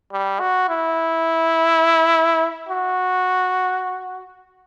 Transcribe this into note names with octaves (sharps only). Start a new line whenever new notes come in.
G3
F#4
E4
F#4